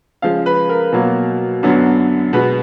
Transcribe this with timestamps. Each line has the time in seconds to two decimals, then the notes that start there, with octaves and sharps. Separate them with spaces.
0.22 C#3 F3 G#3 F5
0.46 B4
0.69 A#4
0.92 B2 F#3 A#3
1.63 F#2 D3 F#3 B3
2.33 B2 G#3 B3 B4